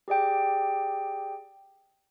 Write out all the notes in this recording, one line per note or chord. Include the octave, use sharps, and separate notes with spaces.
G4 G#4 D5 G5